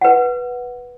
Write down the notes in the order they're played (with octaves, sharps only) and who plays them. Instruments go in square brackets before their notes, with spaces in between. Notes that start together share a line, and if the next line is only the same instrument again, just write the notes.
[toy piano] B4 F#5